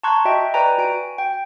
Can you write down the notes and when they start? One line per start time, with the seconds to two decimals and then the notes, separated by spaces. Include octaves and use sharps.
0.03 A5 A#5 C6 C#6 F#6 G#6
0.25 F#4 D#5 E5 G5
0.54 B4 D5 G5 G#5 A#5
0.78 F#4 G#5 D7
1.18 G5